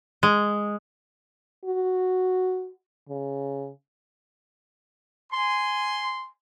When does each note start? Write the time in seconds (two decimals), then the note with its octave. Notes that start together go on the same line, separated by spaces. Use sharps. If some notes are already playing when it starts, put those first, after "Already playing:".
0.23 G#3
1.65 F#4
3.10 C#3
5.32 G#5 C6